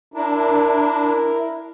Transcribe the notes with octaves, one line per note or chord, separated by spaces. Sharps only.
D4 E4 A#4